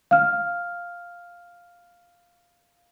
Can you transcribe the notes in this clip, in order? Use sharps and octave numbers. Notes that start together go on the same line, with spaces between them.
F5 F6